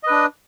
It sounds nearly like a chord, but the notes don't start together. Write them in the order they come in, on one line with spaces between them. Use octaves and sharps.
D#5 B4 D4